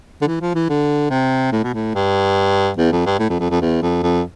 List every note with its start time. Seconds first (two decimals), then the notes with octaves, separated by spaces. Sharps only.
0.22 D3
0.27 E3
0.41 F3
0.55 E3
0.69 D3
1.11 C3
1.52 A2
1.64 B2
1.74 A2
1.95 G2
2.77 E2
2.92 F2
3.06 G2
3.19 A2
3.30 F2
3.40 F2
3.50 F2
3.61 E2
3.82 F2
4.03 F2